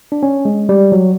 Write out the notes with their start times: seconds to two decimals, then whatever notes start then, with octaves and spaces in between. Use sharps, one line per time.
0.12 D4
0.23 C#4
0.45 G#3
0.69 G3
0.92 F#3